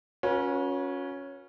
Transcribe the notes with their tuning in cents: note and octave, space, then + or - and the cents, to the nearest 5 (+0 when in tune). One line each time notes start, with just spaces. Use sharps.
C#4 +0 F#4 -40 B4 -45